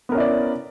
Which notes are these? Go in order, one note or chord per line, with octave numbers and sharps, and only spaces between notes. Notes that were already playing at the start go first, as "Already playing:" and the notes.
B3 C#4 E4 A#4 D5